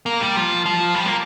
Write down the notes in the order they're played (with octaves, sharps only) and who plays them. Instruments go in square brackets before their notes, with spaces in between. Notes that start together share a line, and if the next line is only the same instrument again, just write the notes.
[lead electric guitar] A#3
G3
F3
F3
G3
A#3